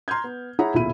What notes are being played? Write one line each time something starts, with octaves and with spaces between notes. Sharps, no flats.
A#5 C6 F6 G6 G#6
B3
E4 G#4 C#5 F#5 A#5 B5
D#1 B1 A#2 E4 B5 D#7